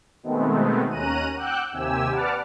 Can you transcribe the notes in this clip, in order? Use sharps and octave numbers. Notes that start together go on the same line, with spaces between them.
B2 D#3 G#3 A3 B3 C4
D#2 C#4 A#5 F#6 D#7
F#5 G5 D6 E6 F#6 G6
D#2 C3 G4 G#5 E6
B4 D5 F#5 A5 D6 F6